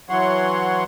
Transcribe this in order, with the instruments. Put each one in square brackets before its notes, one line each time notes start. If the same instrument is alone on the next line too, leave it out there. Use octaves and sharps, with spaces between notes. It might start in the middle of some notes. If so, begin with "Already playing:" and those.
[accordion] E3 F#3 C#5 F#5 C6